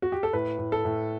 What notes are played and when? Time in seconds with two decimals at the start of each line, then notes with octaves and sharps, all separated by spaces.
0.02 F#4
0.12 G4
0.23 A4
0.33 A2 B4
0.58 A2
0.72 A4
0.85 A2